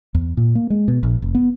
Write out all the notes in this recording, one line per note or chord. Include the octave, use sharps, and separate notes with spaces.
E2
A#2
A#3
G#3
B2
A#1
F1
B3